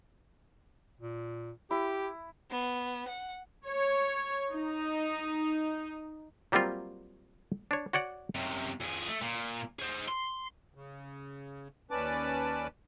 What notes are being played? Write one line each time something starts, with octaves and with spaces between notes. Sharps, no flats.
A#2
E4 G4
B3
F#5
C#5
D#4
F#3 G3 A#3 C4 F4
D4 C#5
F#4 C#5 D5 F#5
F#2 C3
F2 G#4
A3
A#2
G#4 C5
C6
C#3
D#2 C#4 B4 D5 A5 D6